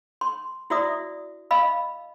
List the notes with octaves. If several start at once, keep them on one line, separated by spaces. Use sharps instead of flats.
C6
E4 F#4 D5 E5 D#6
D#5 F5 B5